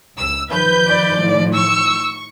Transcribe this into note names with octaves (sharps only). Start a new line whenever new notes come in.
C#2 E6
D#3 F3 B4 G6
D5
A2
C#6 E6